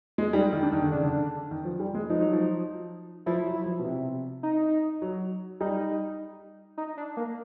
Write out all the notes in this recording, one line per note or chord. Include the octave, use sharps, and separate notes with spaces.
G#3
G3 D#4
D#3
D4
D#3
D3
C#3 D4
D3
D#3
F3
G3
G#3
F3 D#4
F#3
F3
F3 E4
F#3
F3
B2
C3
D#4
F#3
G3 D#4
D#4
D4
A#3